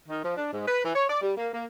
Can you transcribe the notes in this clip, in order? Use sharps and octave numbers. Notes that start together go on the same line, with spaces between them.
D#3
F3
D4
G#2
B4
E3
C#5
D5
G3
A#3
A#3